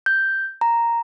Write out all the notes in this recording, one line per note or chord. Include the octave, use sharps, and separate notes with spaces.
G6
A#5